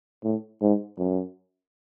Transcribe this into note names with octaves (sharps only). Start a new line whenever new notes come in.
A2
G#2
F#2